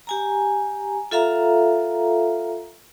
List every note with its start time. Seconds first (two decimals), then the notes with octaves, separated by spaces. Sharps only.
0.07 G4 G#5 A#5
1.11 F4 A4 E5 F5 A#5